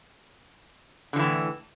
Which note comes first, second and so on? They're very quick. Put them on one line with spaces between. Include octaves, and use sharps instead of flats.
D3 F3 E3 A2